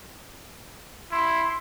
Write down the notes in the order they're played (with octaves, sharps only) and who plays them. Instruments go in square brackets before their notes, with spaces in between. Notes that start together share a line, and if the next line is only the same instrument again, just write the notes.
[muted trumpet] E4 [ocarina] C6